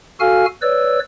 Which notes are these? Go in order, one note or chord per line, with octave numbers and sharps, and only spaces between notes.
F#4 A4 F5 G#5 F6
B4 C#5 D5 E6